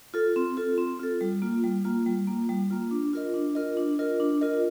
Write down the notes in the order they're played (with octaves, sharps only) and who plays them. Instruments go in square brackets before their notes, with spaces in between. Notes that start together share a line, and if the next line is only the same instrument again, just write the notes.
[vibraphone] F4 A4
C4
F4 A4
C4
F4 A4
G3
A#3 F4
G3
A#3 F4
G3
A#3 F4
G3
A#3 F4
D4
F4 A#4 D#5
D4
F4 A#4 D#5
D4
F4 A#4 D#5
D4
F4 A#4 D#5